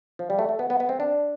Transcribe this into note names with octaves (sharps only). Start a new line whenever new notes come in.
F3
G3
A3
A3
B3
B3
B3
C4
D4